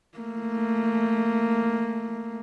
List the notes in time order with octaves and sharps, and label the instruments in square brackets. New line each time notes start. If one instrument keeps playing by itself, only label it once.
[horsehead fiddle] A3 A#3